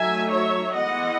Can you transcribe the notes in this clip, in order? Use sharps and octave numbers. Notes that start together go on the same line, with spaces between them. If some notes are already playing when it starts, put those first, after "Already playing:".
Already playing: F#3 A3 D#4 E5 G#5
C#5 E5
E3 G#3 B3 E4 D#5 F#5